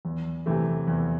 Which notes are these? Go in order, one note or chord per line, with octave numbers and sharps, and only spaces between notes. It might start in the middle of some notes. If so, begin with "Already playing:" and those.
E2
C3 E3 A3
E2